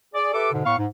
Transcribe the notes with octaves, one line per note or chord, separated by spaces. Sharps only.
G#4 D5
G4 A4 B4 E5 D6
G#2 B2 D3
A2 B3 F5 C#6
G#2